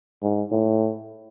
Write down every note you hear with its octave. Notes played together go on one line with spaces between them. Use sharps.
G#2
A2